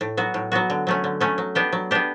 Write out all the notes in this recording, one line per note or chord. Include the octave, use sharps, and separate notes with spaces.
A2
F#3 B3 F#4
A2
F#3 B3 F#4
D3
F#3 A3 C#4
D3
F#3 A3 C#4
F#3
B3 D4 G4
F#3
B3 D4 G4